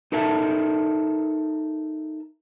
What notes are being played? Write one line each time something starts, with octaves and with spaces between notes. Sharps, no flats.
D#4 A4 A#4 E5 G5 A5